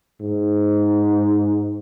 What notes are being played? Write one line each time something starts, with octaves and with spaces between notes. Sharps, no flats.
G#2